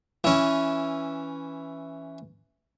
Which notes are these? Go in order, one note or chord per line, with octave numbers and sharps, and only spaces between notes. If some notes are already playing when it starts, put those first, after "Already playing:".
E3 C#4